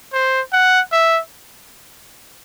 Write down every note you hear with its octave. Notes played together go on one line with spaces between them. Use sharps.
C5
F#5
E5